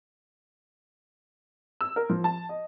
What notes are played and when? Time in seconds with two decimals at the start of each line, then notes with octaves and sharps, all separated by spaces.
1.81 E6
1.96 A#4
2.10 F3
2.24 A5
2.49 D#5